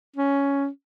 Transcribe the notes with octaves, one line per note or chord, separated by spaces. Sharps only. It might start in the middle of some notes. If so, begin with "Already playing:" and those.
C#4